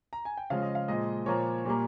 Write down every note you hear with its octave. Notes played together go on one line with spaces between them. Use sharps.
A#5
G#5
G5
C#3 F3 G#3 F5
D#5
F5
A#2 F3 G#3 D#5
A#2 F3 A#3 C#5
A#2 G3 A#3